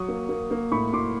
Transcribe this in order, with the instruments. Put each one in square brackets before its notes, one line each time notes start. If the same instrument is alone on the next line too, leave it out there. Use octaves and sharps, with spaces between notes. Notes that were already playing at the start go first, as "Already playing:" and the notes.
Already playing: [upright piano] F#3 C#6 D#6
A#3
A#3
A#3
A2 B5 C#6
A2 C6 D6